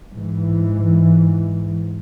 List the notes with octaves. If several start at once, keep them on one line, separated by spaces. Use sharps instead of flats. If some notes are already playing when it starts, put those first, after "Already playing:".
G#2 E3